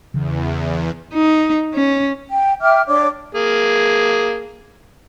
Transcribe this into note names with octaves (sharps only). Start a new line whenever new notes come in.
E2 C#3 E3
D#4
C#4
G5
E5 G5 D6 F6
D4 C#5 D6
A#3 G#4